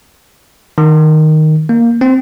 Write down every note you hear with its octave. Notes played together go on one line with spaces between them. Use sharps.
D#3
A#3
C4